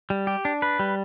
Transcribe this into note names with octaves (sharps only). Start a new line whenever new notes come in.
G3
G4
D4
B4
G3